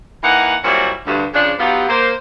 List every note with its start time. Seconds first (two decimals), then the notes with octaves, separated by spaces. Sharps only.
0.23 E3 A#3 D#4 F5 F#5
0.64 A#2 F#3 G3 C4 E4 F#4
1.06 D2 G2
1.34 C#3 F3 D4
1.58 F#3 B3 D#4 F4 G4
1.89 A#3 C5